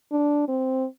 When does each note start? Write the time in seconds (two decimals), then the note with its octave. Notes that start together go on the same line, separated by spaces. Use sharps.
0.12 D4
0.48 C4